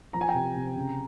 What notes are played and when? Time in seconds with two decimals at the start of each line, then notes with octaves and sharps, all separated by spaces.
0.13 F3 A#5
0.21 G#5
0.28 G5 A#5
0.34 C3
0.55 C3
0.76 C#3